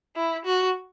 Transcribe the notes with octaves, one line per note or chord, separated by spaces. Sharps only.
E4
F#4